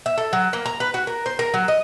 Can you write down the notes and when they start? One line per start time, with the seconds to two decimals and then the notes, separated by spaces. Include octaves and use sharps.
0.06 E5
0.18 A4
0.33 F#3
0.53 A#3
0.66 A#5
0.80 B4
0.94 F#4
1.07 A#4
1.26 C5
1.39 A#4
1.54 F#3
1.68 D#5